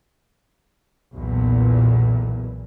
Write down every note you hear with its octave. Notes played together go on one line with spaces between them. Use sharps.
B1 E2 A#2